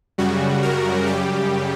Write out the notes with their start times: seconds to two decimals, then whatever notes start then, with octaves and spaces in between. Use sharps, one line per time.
0.18 F#2 C#3 G3 F#4
0.63 A#4
1.06 F#2 C#3 G3 G4